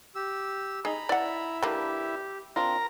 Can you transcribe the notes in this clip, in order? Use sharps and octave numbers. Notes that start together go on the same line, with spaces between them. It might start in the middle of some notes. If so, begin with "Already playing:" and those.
G4 E6
D#4 G#4 G#5 A#5 B5
E4 D5 F#5
D3 A#3 D4 G4 B4
C4 D4 F4 A#4 A#5